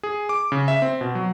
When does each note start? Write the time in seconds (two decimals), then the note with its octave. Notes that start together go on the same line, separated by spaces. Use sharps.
0.03 G#4
0.29 D6
0.52 C#3
0.68 E5
0.82 C4
1.01 B2
1.15 F#3